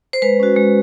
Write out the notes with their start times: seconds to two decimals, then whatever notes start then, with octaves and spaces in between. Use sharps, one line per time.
0.13 C5
0.22 G#3 B4
0.40 C#4 F#4
0.56 G#3